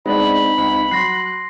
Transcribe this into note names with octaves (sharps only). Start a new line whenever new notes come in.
G#3 B3 C4 D4 D#4 B5
C#2
F#3 C6 F#6 A#6 C7